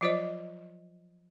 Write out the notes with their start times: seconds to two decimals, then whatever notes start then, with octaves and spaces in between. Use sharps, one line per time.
0.01 F3 F#3 F4 C5 D5 D#5